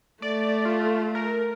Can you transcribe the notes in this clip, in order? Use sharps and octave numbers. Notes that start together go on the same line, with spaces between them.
A3 D5
F4
A#4